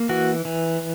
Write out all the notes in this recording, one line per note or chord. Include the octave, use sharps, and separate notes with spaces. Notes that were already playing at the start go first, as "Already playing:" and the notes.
Already playing: A#3
E3 F#4
E3